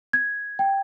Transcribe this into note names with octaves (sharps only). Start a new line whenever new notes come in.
G#6
G5